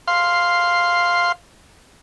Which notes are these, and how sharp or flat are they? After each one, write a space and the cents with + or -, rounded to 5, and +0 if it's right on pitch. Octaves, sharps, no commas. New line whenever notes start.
F5 +0 C6 +0